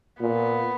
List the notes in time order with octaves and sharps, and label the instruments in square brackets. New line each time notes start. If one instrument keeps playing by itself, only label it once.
[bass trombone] A#2 [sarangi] B3